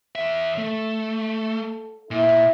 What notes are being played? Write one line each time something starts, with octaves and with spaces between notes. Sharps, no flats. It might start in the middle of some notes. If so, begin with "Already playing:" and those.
E2 E5
A3 A4
A#2 E4